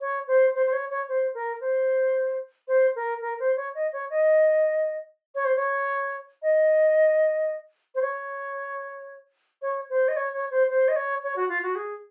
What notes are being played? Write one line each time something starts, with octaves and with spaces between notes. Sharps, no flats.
C#5
C5
C5
C5
C#5
C#5
C5
A#4
C5
C5
A#4
A#4
C5
C#5
D#5
C#5
D#5
C#5
C5
C#5
D#5
C5
C#5
C#5
C5
D#5
C#5
C#5
C5
C5
D#5
C#5
C#5
F#4
F4
F#4
G#4